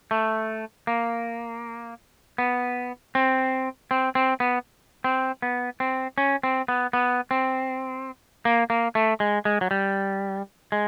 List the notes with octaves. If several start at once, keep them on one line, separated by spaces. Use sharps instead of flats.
A3
A#3
B3
C4
C4
C4
B3
C4
B3
C4
C#4
C4
B3
B3
C4
A#3
A#3
A3
G#3
G#3
F#3
G3
G#3